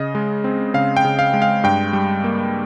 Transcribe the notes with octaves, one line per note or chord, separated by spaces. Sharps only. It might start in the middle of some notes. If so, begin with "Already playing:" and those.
Already playing: C#3 D#5
G#3
C4
C#3 F5
G5
C#3
F5
G#3
F5
G2 G5
G3
A#3